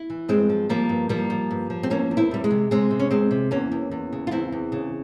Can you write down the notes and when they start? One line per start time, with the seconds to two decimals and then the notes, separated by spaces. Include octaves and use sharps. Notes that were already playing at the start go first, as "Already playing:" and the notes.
Already playing: E4
0.10 E3
0.28 G2 G#3 C4
0.49 F3
0.69 F3 G3 A#3
0.89 G2
1.09 F3 G3 A#3
1.30 F3
1.51 G2
1.70 F3
1.83 C4
1.90 E2 A#3 C#4
2.11 E2
2.17 C4 E4
2.31 E2 G3
2.44 G#3
2.51 C3
2.71 C3 G#3 C4
2.91 C3
2.99 C#4
3.11 E2 G#3 C4
3.31 C3
3.51 E2 A#3 C#4
3.72 E2
3.91 E2
4.13 C#3
4.27 F4
4.31 E2 C4 E4
4.52 E2
4.72 C#3